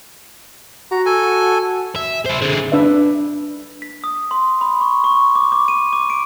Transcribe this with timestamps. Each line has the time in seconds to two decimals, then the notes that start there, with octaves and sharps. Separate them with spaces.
0.91 F#4 A#5
1.06 A4 G#5
1.96 E5
2.26 E4 C5
2.42 D3 G#4
2.72 D4 B4 E5
3.82 B6
4.04 D#6
4.31 C6
4.61 B5
4.81 C#6
5.04 C#6
5.35 D6
5.52 D6
5.68 D#7
5.93 D6
6.10 D7